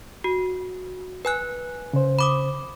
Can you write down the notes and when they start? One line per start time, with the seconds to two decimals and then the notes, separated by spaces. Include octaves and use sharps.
0.24 F#4
1.25 B4 G#5 F#6
1.93 C#3 C5
2.19 B5 D6 D#6